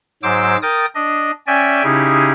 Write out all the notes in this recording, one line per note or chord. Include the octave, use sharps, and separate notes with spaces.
G#2 F#3 C5 D6 E6
A#4 G5 D#6 A6
D4 D#5
C#4 D5 E5 G5 G#5
C#3 C#4 D#4 E4 G4 G#4